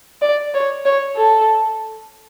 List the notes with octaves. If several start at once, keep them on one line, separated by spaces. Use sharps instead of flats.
D5
C#5
C#5
A4